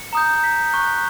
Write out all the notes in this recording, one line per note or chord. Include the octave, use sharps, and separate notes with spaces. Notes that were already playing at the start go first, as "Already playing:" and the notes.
Already playing: C#7
A#5 D#6 G6
B6
C#6 F#6